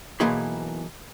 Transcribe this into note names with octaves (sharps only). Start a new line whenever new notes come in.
B1 E3 A#3 G#4 B5 C6